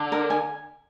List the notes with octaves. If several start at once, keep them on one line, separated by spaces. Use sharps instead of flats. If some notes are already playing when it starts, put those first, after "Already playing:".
Already playing: D3
A#4
G#5